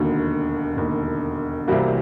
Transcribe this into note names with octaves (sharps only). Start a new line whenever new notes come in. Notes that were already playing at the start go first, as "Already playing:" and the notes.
Already playing: E1 D#2 D3 F#4
E1 D#2 D3
C2 C3 E3 G3 A#3 F#4